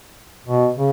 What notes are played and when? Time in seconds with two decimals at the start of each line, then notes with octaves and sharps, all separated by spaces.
0.46 B2
0.76 C#3